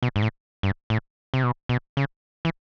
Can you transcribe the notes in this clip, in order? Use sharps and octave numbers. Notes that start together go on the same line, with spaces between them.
B2
G#2
A2
G2
A2
C3
B2
B2
C#3
E3